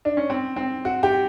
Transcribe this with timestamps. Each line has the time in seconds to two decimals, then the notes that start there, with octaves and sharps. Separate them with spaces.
0.05 D4
0.17 C#4
0.30 C4
0.56 C4
0.85 F#4
1.03 G4